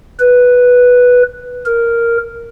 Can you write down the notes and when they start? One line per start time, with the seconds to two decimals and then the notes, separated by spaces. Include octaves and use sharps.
0.20 B4
1.66 A#4